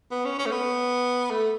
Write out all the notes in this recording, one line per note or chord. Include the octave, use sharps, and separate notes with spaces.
B3
C#4
C#4
A3
B3
A3